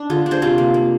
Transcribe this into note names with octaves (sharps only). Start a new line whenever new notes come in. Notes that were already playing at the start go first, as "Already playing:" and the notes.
Already playing: D4
D3 F4 G#4
D4
G#4 C5
C3 F4 G#4
A#3
A#3